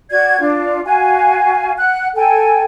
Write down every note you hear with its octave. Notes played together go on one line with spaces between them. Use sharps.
F#4 D5 G#6
D4 F4
F#4 F5 G#5
F#5 F#6
A4 G5 G#5